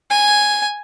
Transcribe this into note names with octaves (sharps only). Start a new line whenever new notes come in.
G#5